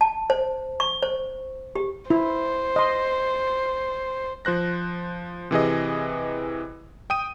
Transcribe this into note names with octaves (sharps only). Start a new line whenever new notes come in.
A5
C5
C#6
C5
G4
E4 C5
D#5 C6
F3 C5 F#6 A#6
C3 E3 G#4 D#5
G5 D#6 D#7